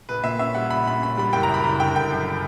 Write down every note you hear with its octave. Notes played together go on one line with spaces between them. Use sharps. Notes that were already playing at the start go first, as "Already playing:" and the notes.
A#1 B4
A#2 E5
C#4 E5
G3 F#5
A#1 B5
A#2 B5
C#4 B5
G3 B5
F#1 G5
A#5
F#2
B5
F#1 A#5
D3 G5
F#1 G5
F#2